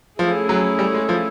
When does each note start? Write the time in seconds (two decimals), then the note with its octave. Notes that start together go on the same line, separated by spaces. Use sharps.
0.18 F3 A3 C#4 E4 G#4
0.49 F#3
0.79 G3
0.94 G#3
1.09 F3